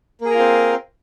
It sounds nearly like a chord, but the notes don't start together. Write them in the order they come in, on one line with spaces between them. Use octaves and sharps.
A#3 G#4 A#4 F4 C4